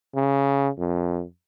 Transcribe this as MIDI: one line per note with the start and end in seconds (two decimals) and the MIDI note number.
0.16 0.69 49
0.79 1.23 41